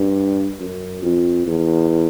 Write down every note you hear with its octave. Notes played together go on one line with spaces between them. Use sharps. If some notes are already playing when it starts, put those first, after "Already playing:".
Already playing: G2
F#2
F2
E2